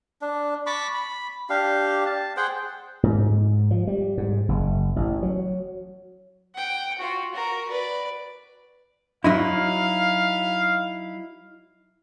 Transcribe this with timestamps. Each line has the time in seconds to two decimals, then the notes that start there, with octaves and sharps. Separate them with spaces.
0.21 D4
0.66 A5 B5 C#6 D6
0.94 B5
1.50 D4 G4 F5
2.06 A5
2.37 G#4 C5 F#5 G5
3.03 G#2
3.71 F3
3.87 G3
4.17 G#2
4.49 F#1
4.96 A1
5.22 F#3
6.54 F#5 G5
6.99 F4 F#4
7.34 F#4 A#4
7.69 B4 D5
9.24 F#3 D#4 E4 F5